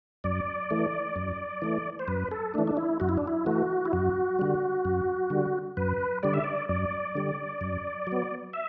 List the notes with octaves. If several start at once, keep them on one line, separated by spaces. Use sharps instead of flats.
F#2 D5
E3 A3
F#2
E3 A3
C5
F#2 B4
A4
E3 A3 D4
D4
E4
F#2 F#4
E4
D4
E4
E3 A3 F#4
E4
F#2 F#4
D3 G3
F#2
D3 G3
F#2 B4
D3 G3 D5
E5
D5
F#2 D5
D3 G3
F#2
F#3
B3
E5